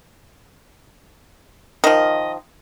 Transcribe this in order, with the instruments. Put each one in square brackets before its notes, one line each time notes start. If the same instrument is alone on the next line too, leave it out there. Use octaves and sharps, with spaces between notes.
[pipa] D#3 F3 [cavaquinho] D#5